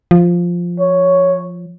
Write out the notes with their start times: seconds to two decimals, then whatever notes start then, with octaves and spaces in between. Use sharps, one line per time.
0.11 F3
0.80 C#5